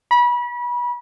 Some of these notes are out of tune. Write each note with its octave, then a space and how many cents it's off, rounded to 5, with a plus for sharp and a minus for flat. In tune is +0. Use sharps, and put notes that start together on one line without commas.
B5 -30